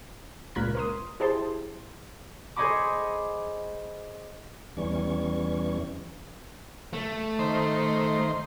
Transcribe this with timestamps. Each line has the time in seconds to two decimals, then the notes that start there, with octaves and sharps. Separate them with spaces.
0.55 C#2 A#2 A#4 F#6 G#6 B6
0.75 A#4 C6 D#6
1.20 E4 G4 G#4 C5 A5 C6
2.56 G#4 C5 C#5 D#5 B5 D6
4.77 E2 E3 G3 C#4 C#6
6.93 A3
7.39 D#3 C5